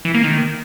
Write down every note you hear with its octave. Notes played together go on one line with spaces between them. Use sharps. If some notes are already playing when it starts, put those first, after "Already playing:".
E3
A#3
D#3